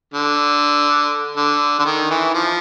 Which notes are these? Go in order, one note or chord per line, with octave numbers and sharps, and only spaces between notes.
D3
D3
D3
D#3
E3
F3